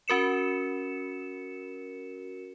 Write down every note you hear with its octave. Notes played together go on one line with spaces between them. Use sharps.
C#4 F#4 A#4 C#7 E7